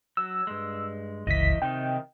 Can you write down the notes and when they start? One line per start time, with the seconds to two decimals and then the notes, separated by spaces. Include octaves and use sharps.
0.17 F#3 E6
0.47 G2 G#3
1.27 G1 C#2 E3 D#5 B6
1.62 C3 D#3 D#4 G5